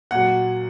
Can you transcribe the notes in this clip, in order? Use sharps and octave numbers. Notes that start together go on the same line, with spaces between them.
A#2 F#3 F#5